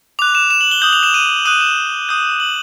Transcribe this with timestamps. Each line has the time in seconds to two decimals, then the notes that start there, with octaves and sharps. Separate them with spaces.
0.19 D6 F#6 F7
0.35 E7
0.51 E7
0.61 F#7
0.71 G7
0.82 D#6 G6 F#7
0.93 F7
1.03 E7
1.14 D#7
1.45 D#6 F#6 D#7
1.61 E7
2.09 D#6 G6
2.40 F#7